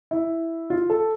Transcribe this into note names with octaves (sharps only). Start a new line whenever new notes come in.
E4
F4
A4